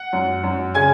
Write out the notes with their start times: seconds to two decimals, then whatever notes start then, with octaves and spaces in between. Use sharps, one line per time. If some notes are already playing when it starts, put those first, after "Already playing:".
Already playing: F#5
0.13 F#2
0.43 F#2
0.75 C#3 G#5 G#6